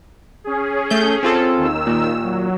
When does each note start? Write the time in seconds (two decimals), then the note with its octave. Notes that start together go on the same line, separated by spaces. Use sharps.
0.44 C#4 G#4
0.90 A3 G6
1.23 C4 F4 A4
1.57 D#2 D#3 E6
1.87 A#2
2.23 F#3